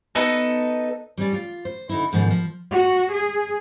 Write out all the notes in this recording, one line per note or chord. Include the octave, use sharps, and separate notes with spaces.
B3 D#4 A4
G3 C#4 D5
F4
C5
D3 D#4 E4
F2 G#2 B2 D#3 F3
F3
F#4
G#4